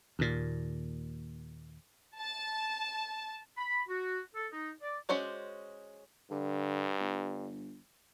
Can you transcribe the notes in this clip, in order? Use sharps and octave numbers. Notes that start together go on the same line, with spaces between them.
D#2 A#2
A5
B5
F#4
A4
D#4
D5
G#3 C#4 F#4 C5 D5
G2 D3
G1